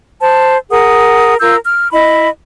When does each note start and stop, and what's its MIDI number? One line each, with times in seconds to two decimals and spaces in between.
0.20 0.57 72
0.20 0.57 81
0.70 1.34 68
0.70 1.34 70
0.70 1.34 78
0.70 1.34 87
1.40 1.56 65
1.40 1.56 70
1.40 1.56 88
1.40 1.56 91
1.65 1.91 89
1.91 2.28 64
1.91 2.28 75
1.91 2.28 83